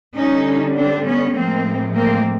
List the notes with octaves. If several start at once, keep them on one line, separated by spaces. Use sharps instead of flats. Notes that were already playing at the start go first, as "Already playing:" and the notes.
D3 G3 C#4 D#4
C4 D4
B3 C#4
A2 F3 G#3 A#3 C4
A#3 C4